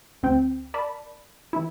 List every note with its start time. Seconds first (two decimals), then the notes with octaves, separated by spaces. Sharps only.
0.23 D2 C4 G5
0.74 A#4 D5 A5 B5
1.53 E3 E4